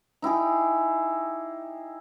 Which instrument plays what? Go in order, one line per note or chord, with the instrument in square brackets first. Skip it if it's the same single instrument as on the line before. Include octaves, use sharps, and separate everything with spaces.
[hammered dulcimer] D#4 E4 G4 G#4